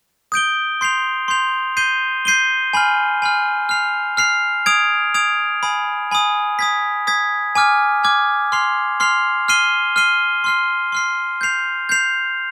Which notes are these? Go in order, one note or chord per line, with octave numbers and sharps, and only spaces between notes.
D#6 G6 D7 G7
C6 G6 C7 F7
C6 G6 C7 F7
G6 C7 D#7 G7
G6 C7 D#7 G7
G#5 B5 F6
G#5 B5 F6
F6 C7 F7
F6 C7 F7
D#6 G#6 D7 F7
D#6 G#6 D7 F7
G#5 B5 D#6
G#5 B5 D#6
D#6 G#6 B6
D#6 G#6 B6
G#5 D6 F6 G#6
G#5 D6 F6 G#6
C6 F6 C7 F7
C6 F6 C7 F7
F6 C7 D#7 G7
F6 C7 D#7 G7
C6 F6 C7
C6 F6 C7
G6 C7 F7
G6 C7 F7